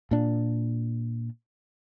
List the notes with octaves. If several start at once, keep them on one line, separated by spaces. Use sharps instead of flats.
A#2 D4